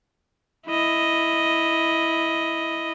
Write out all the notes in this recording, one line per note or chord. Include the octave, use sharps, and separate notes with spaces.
E4 D#5